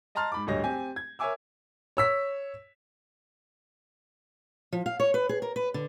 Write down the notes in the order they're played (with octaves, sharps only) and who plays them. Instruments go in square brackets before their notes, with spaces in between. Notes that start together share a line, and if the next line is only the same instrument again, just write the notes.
[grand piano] D#5 A5 A#5 C6 F6 A6
G#2 B5 D6
D1 G2 G3 C#5 D#5 A#6
C4 G4 G#5
G#6
A#4 C#5 E5 G#5 D6 E6
C#5 E6 B6
[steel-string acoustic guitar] F3
F5
C#5
B4
G#4
A#4
B4
D3